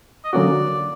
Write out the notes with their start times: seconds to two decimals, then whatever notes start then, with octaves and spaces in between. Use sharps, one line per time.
0.24 D#5
0.33 D3 F#3 A#3 C#4 F#4 D5